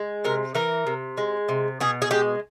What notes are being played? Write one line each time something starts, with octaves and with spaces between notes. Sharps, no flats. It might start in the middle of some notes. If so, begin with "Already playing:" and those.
Already playing: G#3
C3 A#4
E3 A#4
C3
G#3
C3
B2 G#4
G#4
G#3 G4